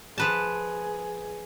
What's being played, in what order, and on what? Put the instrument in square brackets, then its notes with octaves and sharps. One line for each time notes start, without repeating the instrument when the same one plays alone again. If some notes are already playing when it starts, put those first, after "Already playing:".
[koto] F3 B4 A5 [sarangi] G#4